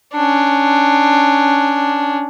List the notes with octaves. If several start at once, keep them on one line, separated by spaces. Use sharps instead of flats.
C#4 D4